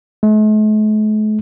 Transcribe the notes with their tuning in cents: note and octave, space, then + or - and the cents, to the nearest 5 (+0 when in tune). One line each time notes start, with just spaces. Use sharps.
A3 -45